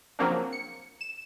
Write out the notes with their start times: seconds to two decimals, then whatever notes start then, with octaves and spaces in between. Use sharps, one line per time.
0.19 C#3 F3 F#3 A#3 C4 D4
0.53 C#7
1.01 E7